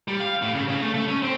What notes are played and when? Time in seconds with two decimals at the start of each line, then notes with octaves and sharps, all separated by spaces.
0.08 G3
0.20 F5
0.42 A2
0.55 C#3
0.68 C#3
0.82 A3
0.94 A3
1.08 C#4
1.22 C4